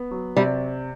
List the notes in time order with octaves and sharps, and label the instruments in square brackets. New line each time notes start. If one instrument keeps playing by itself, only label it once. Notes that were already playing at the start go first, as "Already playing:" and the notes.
Already playing: [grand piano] B3
F#3
[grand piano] C3 [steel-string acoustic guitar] G3